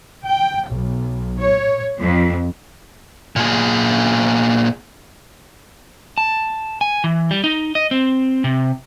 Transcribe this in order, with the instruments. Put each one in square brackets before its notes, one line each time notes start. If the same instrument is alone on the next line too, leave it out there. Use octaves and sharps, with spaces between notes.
[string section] G5
B1
C#5
F2
[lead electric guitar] A#2 G#4
[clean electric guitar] A5
G#5
E3
G3
D#4
D#5
C4
C3